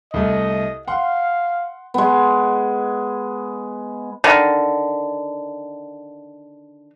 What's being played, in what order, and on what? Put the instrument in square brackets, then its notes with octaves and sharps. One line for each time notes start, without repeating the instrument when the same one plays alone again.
[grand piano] C2 A3 [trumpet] D#5
[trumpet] F5 [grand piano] F#5 C6
[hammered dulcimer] G#3 B3
[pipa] D3 D#3